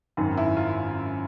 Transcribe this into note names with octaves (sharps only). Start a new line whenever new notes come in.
G#1 F#2 D#3
E4
F4